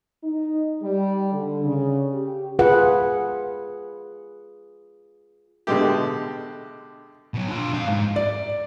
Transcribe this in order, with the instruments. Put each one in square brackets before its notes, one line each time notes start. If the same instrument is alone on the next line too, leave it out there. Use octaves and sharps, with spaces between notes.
[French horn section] D#4
G3
D3
C#3
G4
[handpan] F4 G#4 B4 F#5
[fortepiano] B2 D3 G#3 A3 G4
[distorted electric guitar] B2 F#3
D4 F4
F2 F5
G#2
[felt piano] D5